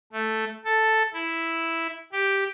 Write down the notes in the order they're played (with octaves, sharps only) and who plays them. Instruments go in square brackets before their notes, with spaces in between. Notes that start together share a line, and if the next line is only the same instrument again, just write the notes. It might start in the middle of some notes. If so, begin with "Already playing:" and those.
[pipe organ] A3
A4
E4
G4